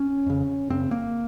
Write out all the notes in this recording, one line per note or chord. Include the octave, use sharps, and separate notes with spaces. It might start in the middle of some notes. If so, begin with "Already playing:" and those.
Already playing: C#4
F2 C#3
F#2 C#3 C4
A#3